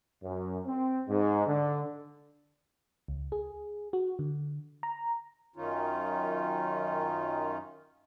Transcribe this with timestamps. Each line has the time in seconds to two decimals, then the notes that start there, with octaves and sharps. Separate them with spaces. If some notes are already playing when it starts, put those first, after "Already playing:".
0.23 F#2
0.67 C4
1.09 G#2
1.47 D3
3.08 C#2
3.32 G#4
3.93 F#4
4.19 D3
4.83 A#5
5.56 F#2 D#3 C#4 D#4 F4